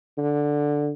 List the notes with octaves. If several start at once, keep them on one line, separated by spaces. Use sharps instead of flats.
D3